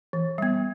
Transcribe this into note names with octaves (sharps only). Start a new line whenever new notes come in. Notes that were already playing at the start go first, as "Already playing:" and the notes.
E3
G3 B3